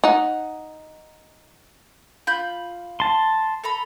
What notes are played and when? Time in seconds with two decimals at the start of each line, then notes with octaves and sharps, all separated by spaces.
0.04 D#4 F#5
2.27 F4 B5 G6
3.00 A5 C6
3.64 A4 A#5 B5